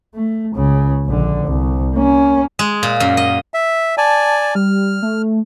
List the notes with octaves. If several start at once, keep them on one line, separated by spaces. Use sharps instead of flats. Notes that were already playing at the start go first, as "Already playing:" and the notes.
A3
C#2 C#3
A#1 D3
C2
A#3 C#4
G#3
A#2
F#2
D#5
E5
D5 G#5 A5
G3 F6
A3